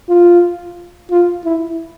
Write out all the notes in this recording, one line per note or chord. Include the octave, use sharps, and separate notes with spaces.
F4
F4
E4